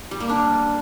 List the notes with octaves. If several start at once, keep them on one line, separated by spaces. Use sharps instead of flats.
G3
A#3
D4